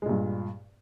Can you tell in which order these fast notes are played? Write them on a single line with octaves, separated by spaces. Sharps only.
G#3 A#2 G2